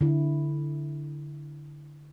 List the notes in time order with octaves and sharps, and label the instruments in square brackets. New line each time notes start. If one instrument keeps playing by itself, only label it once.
[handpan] D3 E4